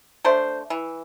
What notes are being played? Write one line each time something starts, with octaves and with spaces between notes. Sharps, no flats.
A3 D4 C5
E3